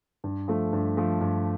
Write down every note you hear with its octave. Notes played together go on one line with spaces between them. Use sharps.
G2
F3 A3
G2
F3 A3
G2